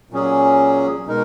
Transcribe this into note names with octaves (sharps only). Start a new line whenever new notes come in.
A#2 F#3 C#4 G#4
B2 G#3 D#4 A#4